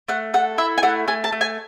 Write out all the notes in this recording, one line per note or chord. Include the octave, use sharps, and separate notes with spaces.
A3 F#5
A4 F#5
E4 E5
G#5
A3 F#5
A3 G#5
A5
A3
G#5